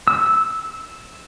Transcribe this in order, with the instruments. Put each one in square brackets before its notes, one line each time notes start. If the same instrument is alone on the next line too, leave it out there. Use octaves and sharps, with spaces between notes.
[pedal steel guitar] E6